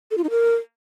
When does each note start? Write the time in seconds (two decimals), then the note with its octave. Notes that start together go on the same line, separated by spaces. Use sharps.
0.11 A4
0.17 F4
0.24 D#4
0.30 A#4